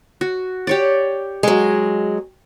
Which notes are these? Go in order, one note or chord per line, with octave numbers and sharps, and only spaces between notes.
F#4
G4 C#5 D5
F#3 G#3